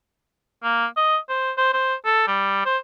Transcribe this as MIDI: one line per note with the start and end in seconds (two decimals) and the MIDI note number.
0.63 0.86 58
0.97 1.17 75
1.29 1.52 72
1.57 1.72 72
1.73 1.95 72
2.05 2.23 69
2.27 2.64 55
2.66 2.77 72